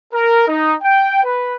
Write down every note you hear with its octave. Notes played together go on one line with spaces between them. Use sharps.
A#4
D#4
G5
B4